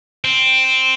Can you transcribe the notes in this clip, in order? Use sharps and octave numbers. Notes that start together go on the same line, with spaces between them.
C4